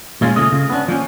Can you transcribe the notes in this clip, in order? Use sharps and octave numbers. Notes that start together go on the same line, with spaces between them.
A#2 G#3 A#3 C#4 F4
C#3 A3 F4 D#5
C#3
B3 C#4 D4
F3 A#3 C#4